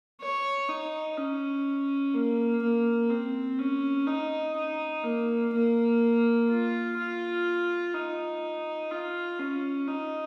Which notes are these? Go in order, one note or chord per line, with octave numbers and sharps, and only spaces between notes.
C#5
D#4
C#4
A#3
A#3
C4
C#4
D#4
D#4
A#3
A#3
F4
F4
D#4
F4
C#4
D#4